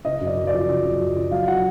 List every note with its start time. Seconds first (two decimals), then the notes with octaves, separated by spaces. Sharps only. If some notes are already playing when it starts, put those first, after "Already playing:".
0.05 C#3 D#5
0.21 F#2
0.27 D5
0.37 F#2
0.47 D5
0.53 F3
0.69 C#3
0.85 F#2
1.00 F#2
1.15 F3
1.31 F#3 F5
1.47 F#3 F#5